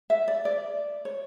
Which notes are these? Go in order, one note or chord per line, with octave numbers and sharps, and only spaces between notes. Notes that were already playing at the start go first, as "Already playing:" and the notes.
E5
D5
D5
C#5